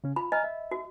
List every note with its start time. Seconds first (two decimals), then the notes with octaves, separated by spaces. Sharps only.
0.04 C#3 C#4
0.16 F4 B5
0.32 D#5 G#5 A#5 F6
0.44 E5
0.71 F#4